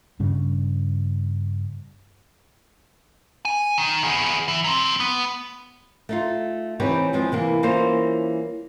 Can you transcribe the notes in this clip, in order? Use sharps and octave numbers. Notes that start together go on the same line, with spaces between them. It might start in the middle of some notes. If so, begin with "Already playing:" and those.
G2 C#3 G3
G#5
D#3
B3 G#4
E3
F#3 C4
B3
A3 D#4 F4
E3 C4 D#4 G4 B4 C#5
E2 F3 G#3 C4
C3 E3 A#3
E3 G3 A#3 C#4 F4 C5